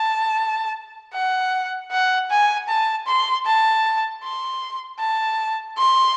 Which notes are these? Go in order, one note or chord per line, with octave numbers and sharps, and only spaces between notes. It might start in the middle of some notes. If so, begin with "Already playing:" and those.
Already playing: A5
F#5
F#5
G#5
A5
C6
A5
C6
A5
C6